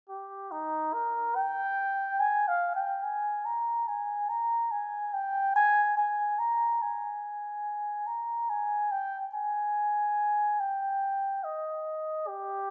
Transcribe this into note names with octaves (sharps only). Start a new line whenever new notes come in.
G4
D#4
A#4
G5
G#5
F5
G5
G#5
A#5
G#5
A#5
G#5
G5
G#5
G#5
A#5
G#5
A#5
G#5
G5
G#5
G5
D#5
G4